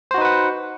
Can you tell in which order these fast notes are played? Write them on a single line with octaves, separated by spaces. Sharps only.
C5 F#4 D#4 B4 F#5